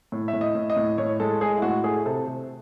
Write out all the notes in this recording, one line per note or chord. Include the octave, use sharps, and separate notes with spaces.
A2
E5
A2
D#5
A2
D#5
A2
A2 C#5
G#3 A4
G#3 G#4
E4
A2 F#4
A3 G#4
C3 A4
C3